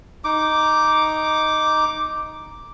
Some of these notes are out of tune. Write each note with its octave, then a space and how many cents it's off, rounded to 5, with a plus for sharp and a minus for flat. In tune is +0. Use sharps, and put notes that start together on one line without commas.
D#4 +0 D6 +0